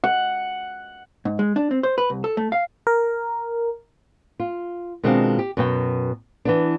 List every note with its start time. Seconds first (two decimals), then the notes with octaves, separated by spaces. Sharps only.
0.04 F#5
1.25 G#2
1.39 G#3
1.56 D4
1.71 C4
1.83 C5
1.98 B4
2.10 C2
2.24 A4
2.37 A3
2.52 F5
2.87 A#4
4.40 F4
5.03 B2 D#3 G#3 C4 D4 F4
5.39 G4
5.57 F#2 B2 G5
6.45 E3 B3 D4